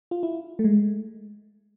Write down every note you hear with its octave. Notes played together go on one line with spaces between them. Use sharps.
F4
E4
A3
G#3